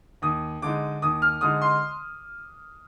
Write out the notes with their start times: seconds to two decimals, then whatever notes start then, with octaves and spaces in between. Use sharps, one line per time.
0.22 D#2 D#6
0.62 D3 G#3 D#4 D6
1.02 D#2 D#6
1.22 F6
1.41 D3 G#3 D#4 D#6
1.61 C6